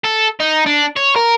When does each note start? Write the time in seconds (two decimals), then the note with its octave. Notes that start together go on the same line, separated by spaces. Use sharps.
0.05 A4
0.40 D#4
0.66 D4
0.96 C#5
1.16 A#4